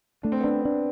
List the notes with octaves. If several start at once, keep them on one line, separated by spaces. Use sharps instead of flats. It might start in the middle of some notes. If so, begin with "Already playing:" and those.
A3 D4
C4
B3
C4 D4
D4